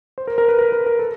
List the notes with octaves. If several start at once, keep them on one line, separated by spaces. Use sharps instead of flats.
C5
A#4
A#4
B4
A#4
B4
A#4
A4